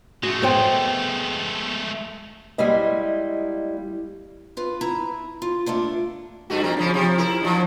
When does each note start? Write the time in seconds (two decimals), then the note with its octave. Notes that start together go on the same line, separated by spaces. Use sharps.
0.23 G#3 A3 F#4
0.42 B3 C5 G5
2.58 G3 G#3 A#3 E4 D#5
4.57 F4 B4
4.81 E4 A#5
5.42 F4
5.66 A3 A#3 D4 F4
6.50 G2 A3 F#4
6.63 A#2 C4 A#4
6.77 C#3 F3 C#4
6.94 C3 F3
7.18 E4 A#4
7.41 F#2 A#2 F3